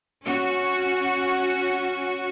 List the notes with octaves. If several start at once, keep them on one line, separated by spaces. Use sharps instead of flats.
C#4 F#4